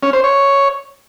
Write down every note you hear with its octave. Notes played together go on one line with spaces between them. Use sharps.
C#4
C5
C#5